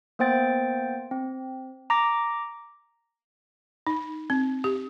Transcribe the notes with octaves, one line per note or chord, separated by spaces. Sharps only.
A#3 B3 C5 G5 A6
C4
A#5 D6 A#6
D#4
C4
G4